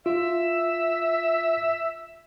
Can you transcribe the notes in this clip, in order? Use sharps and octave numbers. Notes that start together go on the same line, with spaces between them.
F4 E5